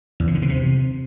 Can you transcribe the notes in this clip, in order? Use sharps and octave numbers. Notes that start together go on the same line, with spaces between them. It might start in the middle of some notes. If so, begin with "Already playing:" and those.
E2
C3
D3
B2
C3